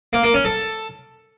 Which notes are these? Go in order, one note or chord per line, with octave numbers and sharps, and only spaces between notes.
A#3
A#3
C#4
A4